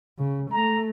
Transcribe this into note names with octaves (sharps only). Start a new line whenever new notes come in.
C#3
A3 A#5